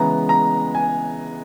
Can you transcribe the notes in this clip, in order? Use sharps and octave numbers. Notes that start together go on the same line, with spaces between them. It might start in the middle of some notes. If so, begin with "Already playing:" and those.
Already playing: C#3 E3 G#3 B3 A#5
A#5
G#5